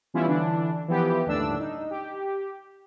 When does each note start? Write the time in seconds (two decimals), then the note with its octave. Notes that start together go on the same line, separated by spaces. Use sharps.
0.14 E3 G3 B3 C#4 E4 F4
0.27 D3 E3 D4
0.88 E3 F3 B3 G4
1.25 G1 D#2 A2 D4 E6
1.59 D#4
1.91 G4